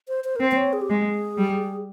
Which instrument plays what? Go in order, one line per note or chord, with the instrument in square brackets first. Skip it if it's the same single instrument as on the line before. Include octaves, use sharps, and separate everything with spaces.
[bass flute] C5
C5
A#4
[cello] C4 [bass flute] C5
[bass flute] C5
C#5
G#4
G4
[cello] G#3 [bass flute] G#4
[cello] G3